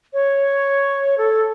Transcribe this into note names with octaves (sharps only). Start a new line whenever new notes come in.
C#5
A4